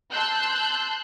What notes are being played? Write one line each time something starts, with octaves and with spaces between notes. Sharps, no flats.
A5 C6 E6 F#6 G6